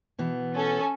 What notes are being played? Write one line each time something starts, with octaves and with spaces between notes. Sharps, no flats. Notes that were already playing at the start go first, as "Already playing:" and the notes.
B2 E3 B3
C#4 A4